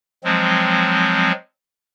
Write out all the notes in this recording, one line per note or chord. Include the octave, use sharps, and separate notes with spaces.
F3 F#3 G#3 C4